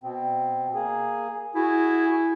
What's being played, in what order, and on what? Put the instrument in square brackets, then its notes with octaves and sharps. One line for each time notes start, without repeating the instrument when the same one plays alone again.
[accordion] B2 C4
A#3 G#4
[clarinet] E4 [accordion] F#4 G#4